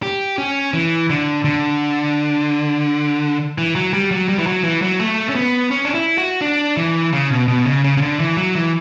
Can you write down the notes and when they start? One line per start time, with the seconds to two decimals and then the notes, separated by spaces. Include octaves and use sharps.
0.03 G4
0.38 C#4
0.73 E3
1.10 D3
1.45 D3
3.58 E3
3.75 F#3
3.93 G3
4.11 F#3
4.28 G3
4.39 E3
4.47 F#3
4.64 E3
4.82 F#3
5.00 A3
5.29 C#4
5.35 B3
5.71 C#4
5.85 D4
5.95 E4
6.18 F#4
6.42 D4
6.77 E3
7.13 C#3
7.31 B2
7.48 B2
7.66 C#3
7.84 C#3
7.97 C#3
8.01 D3
8.19 E3
8.37 F#3
8.55 E3